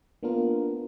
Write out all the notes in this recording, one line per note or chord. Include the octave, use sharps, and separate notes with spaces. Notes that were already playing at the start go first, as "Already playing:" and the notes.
A#3 B3 D4 F4 A#4